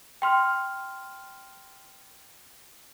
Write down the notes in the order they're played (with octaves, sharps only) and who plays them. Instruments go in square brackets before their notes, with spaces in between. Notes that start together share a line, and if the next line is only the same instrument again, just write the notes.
[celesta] G5 C6 F6